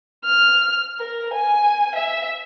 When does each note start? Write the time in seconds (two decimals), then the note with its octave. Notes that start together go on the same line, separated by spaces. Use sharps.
0.25 F6
0.99 A#4
1.34 G#5
1.96 E5